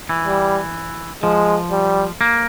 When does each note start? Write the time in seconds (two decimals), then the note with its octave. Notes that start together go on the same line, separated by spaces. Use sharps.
0.09 E3
0.26 G3
1.23 F3 G#3
1.71 G3
2.21 A#3